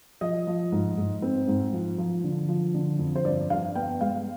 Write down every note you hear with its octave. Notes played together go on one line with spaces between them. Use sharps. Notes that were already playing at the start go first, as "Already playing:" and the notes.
F3 D#5
F3
G#2
G#2
C4
G#2
F3
F3
D3
F3
D3
F2
C5
G2 D5
G2 F5
B3 G5
G#3 F5